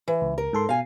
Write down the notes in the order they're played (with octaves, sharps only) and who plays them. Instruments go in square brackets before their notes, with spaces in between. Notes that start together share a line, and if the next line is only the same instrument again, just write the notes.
[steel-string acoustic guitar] E3
[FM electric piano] C#2
[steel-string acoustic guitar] A#4
[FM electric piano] G#2 A4 C6
[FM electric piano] B2 [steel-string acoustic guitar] F5 G#5